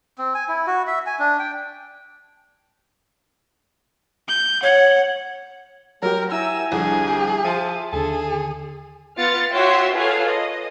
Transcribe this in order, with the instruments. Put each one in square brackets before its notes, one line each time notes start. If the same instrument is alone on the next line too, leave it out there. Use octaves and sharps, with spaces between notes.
[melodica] C4
G#5
E4
F#4
E5
G#5
D4
G5
[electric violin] G6
[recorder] C#5 [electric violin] F#5
[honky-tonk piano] F#3 G4 [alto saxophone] G#3 [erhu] A#4 [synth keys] A#5
[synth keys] E4 E5 A#5 [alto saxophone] G#5 [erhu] E6
[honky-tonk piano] C2 F2 D3 [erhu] G#4
[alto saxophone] G4
[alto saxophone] F3 [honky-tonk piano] E5 A5 C6 [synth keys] D#7
[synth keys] D#2 D3 [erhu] G#4 [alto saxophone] A4
[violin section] B3 F4 F6 A6 C#7
F4 F#4 C#5 E5 G5 C6
F4 G#4 A4 B4 C#5 F5
D#5